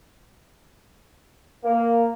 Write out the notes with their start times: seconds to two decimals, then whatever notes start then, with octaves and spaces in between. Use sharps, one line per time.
1.64 A#3